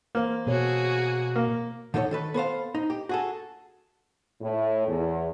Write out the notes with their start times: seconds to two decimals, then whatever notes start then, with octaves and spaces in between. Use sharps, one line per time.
0.15 E3 A#3 B4 C5
0.46 B2 B3 F#4 G#4 A4 C#5
1.36 A#3
1.94 D3 D#4 A4 A#4 C#5
2.11 D#3 A4 B4
2.34 B3 A4 C5 F5
2.75 D#4
2.90 G4
3.09 F#4 G#4 A4
4.41 A2
4.86 E2